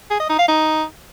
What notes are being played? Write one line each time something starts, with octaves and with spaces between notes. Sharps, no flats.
G#4
D#5
D#4
F5
D#4